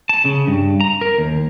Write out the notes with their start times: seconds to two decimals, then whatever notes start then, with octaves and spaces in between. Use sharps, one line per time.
0.09 A5
0.25 C#3
0.48 G2
0.81 A#5
1.01 A#4
1.18 D#2